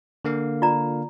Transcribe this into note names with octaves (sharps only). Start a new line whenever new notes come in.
D3 A#3 F5
F4 D5 A#5